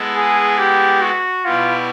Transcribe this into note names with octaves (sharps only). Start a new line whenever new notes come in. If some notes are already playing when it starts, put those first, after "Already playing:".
Already playing: G#3 B3 E4 A4
G#4
G4
F#4
B2 G3 B3 E4 F4 G4